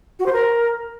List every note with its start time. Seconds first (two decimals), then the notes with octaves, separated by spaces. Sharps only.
0.19 F#4
0.26 C5
0.33 A#4